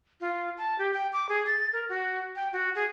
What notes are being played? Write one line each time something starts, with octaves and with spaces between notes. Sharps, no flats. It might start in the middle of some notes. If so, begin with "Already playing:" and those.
F4
A5
G4
G5
D6
G#4
A6
A#4
F#4
G5
F#4
G#4